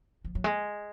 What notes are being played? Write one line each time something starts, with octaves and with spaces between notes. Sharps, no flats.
F3
F#3
G#3